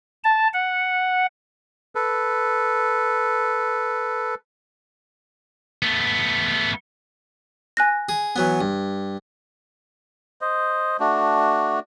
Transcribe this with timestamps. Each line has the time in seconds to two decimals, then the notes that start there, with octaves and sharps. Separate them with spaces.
0.24 A5
0.54 F#5
1.95 A4 B4
5.82 A3 B3
7.77 G#5 F#6 A#6
8.09 G#4
8.36 E3 F#3 B3
8.61 G2
10.41 C5 D#5
11.00 A3 D4 F#4